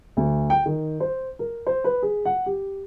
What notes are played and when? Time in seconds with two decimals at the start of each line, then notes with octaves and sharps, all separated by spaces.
0.17 D2
0.50 G5
0.66 D#3
1.00 C5
1.39 A#4
1.67 C5
1.84 B4
2.02 G#4
2.25 F#5
2.46 G4